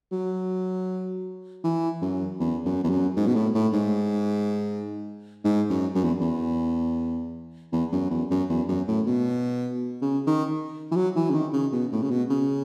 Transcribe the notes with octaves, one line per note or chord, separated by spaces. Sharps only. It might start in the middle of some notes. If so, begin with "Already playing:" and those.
F#3
E3
F#2
E2
F#2
E2
F#2
G#2
B2
A2
A2
G#2
G#2
F#2
F#2
E2
E2
E2
F#2
E2
F#2
E2
F#2
A2
B2
C#3
D#3
E3
F#3
E3
C#3
D#3
C#3
B2
A2
C#3
B2
C#3